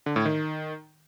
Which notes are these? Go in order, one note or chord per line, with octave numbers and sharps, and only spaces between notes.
D3
A2
D#3